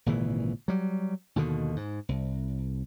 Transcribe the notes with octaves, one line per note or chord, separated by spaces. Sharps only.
G#1 A#2 C#3 E3
F#3 G3
D#2 B2 D3 D#3
G#2
C2